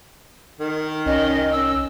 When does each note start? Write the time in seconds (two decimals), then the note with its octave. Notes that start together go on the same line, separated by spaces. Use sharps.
0.60 D#3
1.06 C2 C#4 D#5
1.52 C#4 E6